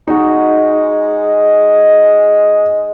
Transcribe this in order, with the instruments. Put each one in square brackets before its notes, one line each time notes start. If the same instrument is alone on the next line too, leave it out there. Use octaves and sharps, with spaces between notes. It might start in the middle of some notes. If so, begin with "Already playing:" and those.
[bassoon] G#3 [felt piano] D#4 F#4